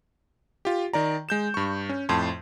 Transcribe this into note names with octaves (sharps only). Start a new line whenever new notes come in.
F4 G4
D#3 D5 A#5
G#3 G6 E7
G2 C#6
C#4
F2 A2 A5 C6